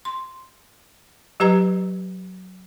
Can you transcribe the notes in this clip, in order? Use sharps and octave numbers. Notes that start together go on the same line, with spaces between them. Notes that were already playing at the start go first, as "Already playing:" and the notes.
C6
F#3 G4 B4 D#5 A#5